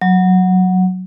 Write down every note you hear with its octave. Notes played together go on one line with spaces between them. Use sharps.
F#3